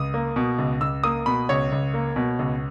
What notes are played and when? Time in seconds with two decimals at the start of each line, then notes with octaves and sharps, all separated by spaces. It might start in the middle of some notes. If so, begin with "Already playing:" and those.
Already playing: C#2 D#6
0.14 A#3
0.36 B2
0.59 C#2
0.81 C#2 E6
1.04 A#3 D#6
1.26 B2 B5
1.49 C#2 C#5
1.72 C#2
1.94 A#3
2.16 B2
2.39 C#2